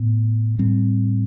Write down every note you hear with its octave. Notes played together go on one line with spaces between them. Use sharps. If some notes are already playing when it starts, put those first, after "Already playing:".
Already playing: A2 B3
A2 G3 C4